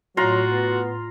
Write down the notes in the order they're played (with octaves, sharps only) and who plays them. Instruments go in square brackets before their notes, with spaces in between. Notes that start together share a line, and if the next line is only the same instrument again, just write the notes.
[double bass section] A2 [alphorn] F#3 [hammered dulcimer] F4 A#5 C6 [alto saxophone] F#4
[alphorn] B3